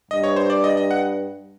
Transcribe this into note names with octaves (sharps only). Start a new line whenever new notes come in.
G2 D#5
C#5
C5
D5
D#5
D#5
F#5